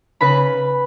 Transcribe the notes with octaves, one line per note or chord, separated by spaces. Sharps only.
C#3 B4 B5